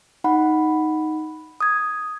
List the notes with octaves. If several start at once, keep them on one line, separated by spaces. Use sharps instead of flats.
D#4 F#5 B5
D#6 G#6